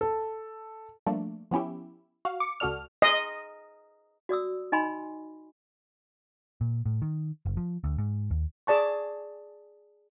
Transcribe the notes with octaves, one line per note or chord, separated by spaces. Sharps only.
A4
F3 G3 A3 A#3 D4
F3 B3 C#4 E4 G4
F#4 F5
D6 C#7
C#2 F#4 A4 D5 F6
D#5
F#4 D5 D#6 E6
D#4 D#5 G#5 B5 C6
A#2
A2
D#3
F#1
F3
D2
G#2
D#2
G#4 D5 A5 C#6